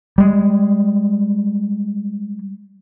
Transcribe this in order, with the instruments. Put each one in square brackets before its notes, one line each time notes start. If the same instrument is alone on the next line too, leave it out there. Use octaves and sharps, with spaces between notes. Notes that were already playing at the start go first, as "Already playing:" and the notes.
[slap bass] G3 G#3